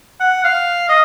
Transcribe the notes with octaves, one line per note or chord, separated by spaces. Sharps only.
F#5
F5
D#5